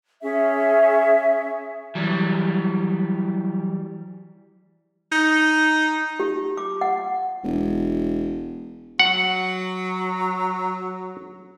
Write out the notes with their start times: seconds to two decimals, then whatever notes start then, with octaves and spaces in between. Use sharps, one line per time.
0.22 C#4 G#4 E5
1.95 E3 F#3 G3
5.12 D#4
6.20 G4
6.57 D6
6.81 F#5
7.44 E1
9.00 F#3 F#5